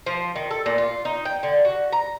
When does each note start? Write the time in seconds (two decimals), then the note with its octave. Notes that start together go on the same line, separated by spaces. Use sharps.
0.06 F3
0.36 D#3
0.51 A4
0.66 A#2
0.78 F4
1.05 D#4
1.25 G5
1.43 D3
1.65 F#4
1.92 A#5